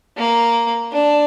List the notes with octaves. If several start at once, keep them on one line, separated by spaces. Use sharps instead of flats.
A#3
D4